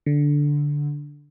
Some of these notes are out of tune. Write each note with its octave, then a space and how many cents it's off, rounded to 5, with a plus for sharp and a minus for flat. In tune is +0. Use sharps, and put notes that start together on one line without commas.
D3 -5